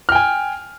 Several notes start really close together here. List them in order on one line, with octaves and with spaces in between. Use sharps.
F6 G5 G#5